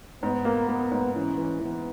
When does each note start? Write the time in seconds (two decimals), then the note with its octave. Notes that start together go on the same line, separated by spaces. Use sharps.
0.23 G#2 B3
0.45 A#3
0.68 A#3
0.91 G#2
1.14 E3 C#4
1.37 E3
1.60 E3 B3